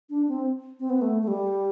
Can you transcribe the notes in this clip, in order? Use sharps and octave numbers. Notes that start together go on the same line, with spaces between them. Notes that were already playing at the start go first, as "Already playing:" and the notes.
D4
C4
C4
B3
A3
A3
G3